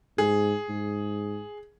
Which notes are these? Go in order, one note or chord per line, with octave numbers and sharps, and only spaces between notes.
G#2 G#4
G#2